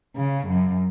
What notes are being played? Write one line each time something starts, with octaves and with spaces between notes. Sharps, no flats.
C#3
F#2